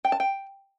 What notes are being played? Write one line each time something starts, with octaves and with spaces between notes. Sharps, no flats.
G5
A5
G5